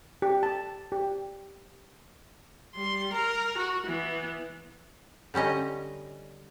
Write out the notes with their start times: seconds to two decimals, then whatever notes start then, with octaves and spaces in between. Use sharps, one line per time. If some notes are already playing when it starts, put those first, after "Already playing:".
0.22 G4
0.43 A5
0.92 G4
2.75 G3 C6
3.13 A#4 A#5
3.58 F#4
3.86 E3 B3
5.34 D3 G3 C#4 D#5 A#5